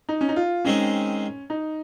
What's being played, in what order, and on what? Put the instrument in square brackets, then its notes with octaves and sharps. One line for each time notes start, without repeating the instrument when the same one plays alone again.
[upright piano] D#4
C#4
D#4
F4
[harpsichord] D#3 G#3 C4 [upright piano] C#4
[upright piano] D#4